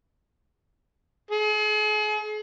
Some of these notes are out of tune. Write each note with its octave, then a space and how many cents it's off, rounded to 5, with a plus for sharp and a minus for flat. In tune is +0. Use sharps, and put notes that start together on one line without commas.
G#4 +40